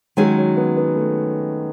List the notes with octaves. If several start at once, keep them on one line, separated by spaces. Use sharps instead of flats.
D#3 F#3 G#3 C#4 G#4 C#5
F#3
B3
B3
A3